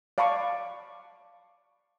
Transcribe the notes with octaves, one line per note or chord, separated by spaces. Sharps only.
D5 F5 A5 B5 C#6 D6